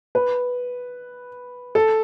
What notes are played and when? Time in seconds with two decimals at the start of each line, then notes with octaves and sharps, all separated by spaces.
0.15 B4
1.75 A4